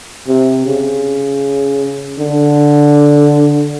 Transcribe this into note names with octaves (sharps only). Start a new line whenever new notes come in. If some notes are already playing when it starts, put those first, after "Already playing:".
C3
C#3
D3